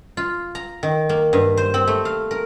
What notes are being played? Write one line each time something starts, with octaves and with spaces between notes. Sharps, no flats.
F4
A#5
D#3
A#3
G2
C5
C4
A3
F5
A#4